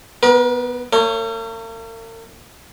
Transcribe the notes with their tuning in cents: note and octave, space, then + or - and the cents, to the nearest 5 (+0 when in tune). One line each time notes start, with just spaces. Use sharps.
B3 +0 A#4 +40
A#3 -45 C#5 +0